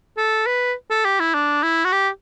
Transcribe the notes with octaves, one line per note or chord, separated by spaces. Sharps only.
A4
B4
A4
G4
E4
D4
E4
F#4
G4